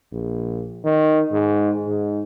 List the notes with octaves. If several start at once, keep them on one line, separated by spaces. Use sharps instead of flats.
A#1
D#3
G#2
G#2